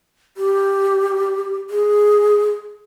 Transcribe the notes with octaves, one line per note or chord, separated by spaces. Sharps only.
G4
G#4